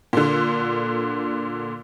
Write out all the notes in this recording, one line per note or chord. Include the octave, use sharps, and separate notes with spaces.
A#2 D3